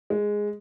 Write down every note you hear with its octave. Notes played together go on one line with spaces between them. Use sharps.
G#3